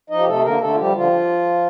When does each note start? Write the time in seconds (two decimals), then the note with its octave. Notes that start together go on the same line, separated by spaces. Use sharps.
0.10 F3 D#4 D#5
0.19 G4
0.27 C3 A3 A4
0.44 D3 A#3 A#4
0.61 D3 A3 A4
0.73 F4
0.78 F3 G3 G4
0.95 D3 F3 F4